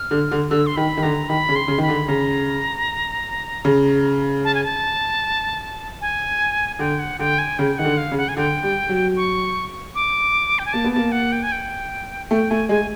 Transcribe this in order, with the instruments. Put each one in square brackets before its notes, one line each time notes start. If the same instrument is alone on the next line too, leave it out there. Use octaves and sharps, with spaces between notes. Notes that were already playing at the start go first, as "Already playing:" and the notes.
Already playing: [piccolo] F6
[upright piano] D3
D3
[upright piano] D3 [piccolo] E6
[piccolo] C6
[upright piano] D#3 [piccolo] B5
[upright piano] D#3
[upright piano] D3 [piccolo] A#5
[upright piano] D#3 [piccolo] B5
[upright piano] C#3
[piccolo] C6
[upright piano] C#3
[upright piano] D#3 [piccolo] B5
[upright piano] D3
[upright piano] C#3 [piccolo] A#5
[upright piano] C#3
[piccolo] A5
G#5
A5
G#5
[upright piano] D3 [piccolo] G5
[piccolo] F#5
[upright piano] D3 [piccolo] G5
[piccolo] G#5
[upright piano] C#3 [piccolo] G5
[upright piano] D#3 [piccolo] F#5
[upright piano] D3
[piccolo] F5
[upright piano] C#3
[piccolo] F#5
G#5
[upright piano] D3 [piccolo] G5
[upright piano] G3
F#3
[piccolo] C#6
D6
G5
G#5
[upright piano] A#3 [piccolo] A5
[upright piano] B3
[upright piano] A#3 [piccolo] A5
[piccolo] F#5
G5
G#5
G5
[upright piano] A3 [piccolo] G5
[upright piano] A3 [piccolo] G#5
[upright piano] G#3 [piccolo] G#5